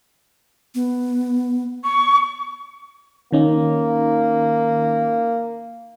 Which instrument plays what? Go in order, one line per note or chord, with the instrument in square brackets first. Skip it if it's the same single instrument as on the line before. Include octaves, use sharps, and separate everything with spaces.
[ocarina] B3
[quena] C#6
[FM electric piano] D#3 C#4 D#4 [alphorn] A#3